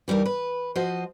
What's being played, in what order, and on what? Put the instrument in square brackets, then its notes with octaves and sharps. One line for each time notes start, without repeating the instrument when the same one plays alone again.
[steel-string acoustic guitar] E3 G3 D#4 A#4
B4
F3 F#4 C5 D#5